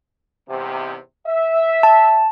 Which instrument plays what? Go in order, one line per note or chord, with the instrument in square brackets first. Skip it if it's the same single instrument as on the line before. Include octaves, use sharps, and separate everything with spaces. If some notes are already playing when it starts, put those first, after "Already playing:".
[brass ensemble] E2 G#2 C3
E5
[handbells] A5